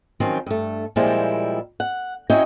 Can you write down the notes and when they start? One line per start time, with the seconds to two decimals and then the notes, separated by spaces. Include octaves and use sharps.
0.20 D#3 F3 F#3 C4 C#4
0.46 G2 A3
0.96 A#2 F3 G3 G#3 C4 E4
1.80 F#5
2.30 C#4 E4 F#4 C#5 D#5 G5